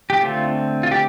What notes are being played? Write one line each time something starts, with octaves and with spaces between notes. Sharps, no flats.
G4
D3 A3 C4 F4
F4
G4